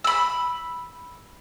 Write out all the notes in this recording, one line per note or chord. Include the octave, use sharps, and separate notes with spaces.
B5 E6